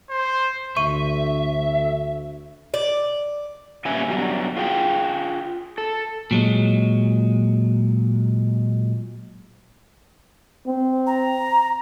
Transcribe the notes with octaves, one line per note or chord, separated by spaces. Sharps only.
C5
D2 E5 C#6 D#7
D5
A#2 G3 C#4 B4 E5 G#5
G2 B2 F#3 G3
F4 G#4 G5
A4
A#2 F#3 G#3
C4
A#5